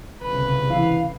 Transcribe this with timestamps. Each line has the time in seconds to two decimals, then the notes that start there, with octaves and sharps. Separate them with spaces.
0.22 G1 C2 C#3 B4
0.69 E3 F5